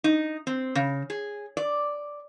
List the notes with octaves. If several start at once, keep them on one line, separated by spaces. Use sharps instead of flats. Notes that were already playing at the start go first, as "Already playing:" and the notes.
D#4
C4
C#3
G#4
D5